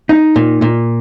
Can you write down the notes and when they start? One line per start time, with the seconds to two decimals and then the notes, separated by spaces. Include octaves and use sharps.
0.09 D#4
0.36 A#2
0.62 A#2